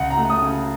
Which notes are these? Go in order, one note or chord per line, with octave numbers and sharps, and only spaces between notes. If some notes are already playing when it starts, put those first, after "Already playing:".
Already playing: C#2 F#5
A#5
A3
D#6
C#3